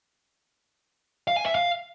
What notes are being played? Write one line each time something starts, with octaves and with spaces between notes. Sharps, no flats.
F5
G#5
E5
F5